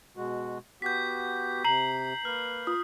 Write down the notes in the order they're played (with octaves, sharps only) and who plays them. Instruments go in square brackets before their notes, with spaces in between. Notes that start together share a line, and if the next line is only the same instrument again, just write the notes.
[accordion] B2 G#3 F#4
[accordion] B3 F#4 G4 [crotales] G6 B6
[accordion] C3 [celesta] A#5 [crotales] C7 F#7
[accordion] A#3 B4 [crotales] F6
[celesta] F4 [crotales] D#6